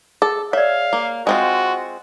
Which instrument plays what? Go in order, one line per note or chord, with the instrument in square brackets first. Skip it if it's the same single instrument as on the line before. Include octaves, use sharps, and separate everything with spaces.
[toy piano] G#4 [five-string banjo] A4
[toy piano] C#5 D5 [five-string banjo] E5 [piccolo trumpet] F5
[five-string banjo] A#3
[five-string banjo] G#3 C4 F4 [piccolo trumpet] F#4